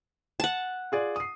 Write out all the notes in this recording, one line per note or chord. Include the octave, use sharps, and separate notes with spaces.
F#5 A5
F4 G#4 D5
D#6 C7